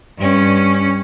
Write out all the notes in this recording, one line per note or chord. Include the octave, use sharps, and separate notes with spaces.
G2 C#4